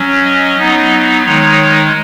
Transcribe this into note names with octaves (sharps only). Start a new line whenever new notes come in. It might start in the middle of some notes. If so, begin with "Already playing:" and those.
Already playing: F#3 C#4
D#5
F#3 B3 D#4
D#3 G#3 D#4 C#5